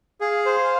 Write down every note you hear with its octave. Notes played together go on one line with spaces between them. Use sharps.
G#4 F5
C5